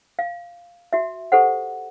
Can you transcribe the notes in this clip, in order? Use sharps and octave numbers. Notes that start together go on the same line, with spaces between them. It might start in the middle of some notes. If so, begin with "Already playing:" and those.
F5
F#4 E5
G4 A4 C5 F#5